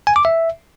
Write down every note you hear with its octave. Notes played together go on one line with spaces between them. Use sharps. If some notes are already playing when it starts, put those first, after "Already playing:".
G#5
D6
E5